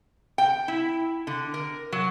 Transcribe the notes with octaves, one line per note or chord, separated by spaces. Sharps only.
G5
E4
D3
A#4
F#3